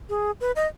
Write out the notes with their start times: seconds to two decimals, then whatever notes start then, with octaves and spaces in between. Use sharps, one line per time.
0.09 G#4
0.41 B4
0.56 D#5